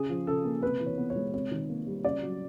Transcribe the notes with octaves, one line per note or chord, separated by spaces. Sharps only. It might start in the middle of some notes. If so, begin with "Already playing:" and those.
Already playing: C#3 G#4
F3
C#3 A4
A#3
C3 B4
E3
C#5
B3
C#5
G#3
C3 C#5
D#3
A#3
G3
C#3 D5
F#3